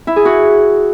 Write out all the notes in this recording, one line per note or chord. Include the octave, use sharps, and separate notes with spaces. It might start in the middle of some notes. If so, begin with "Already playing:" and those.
E4
G#4
F#4